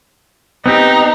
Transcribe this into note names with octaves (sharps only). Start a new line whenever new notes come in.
B3 C4 D#4 G4